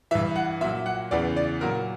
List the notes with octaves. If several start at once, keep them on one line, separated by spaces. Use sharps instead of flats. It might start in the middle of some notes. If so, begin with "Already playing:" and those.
G2 E3 E5
F#5
A#2 F#3 E5
F#5
E2 C#3 E3 D5
D5
A#2 F#3 A#4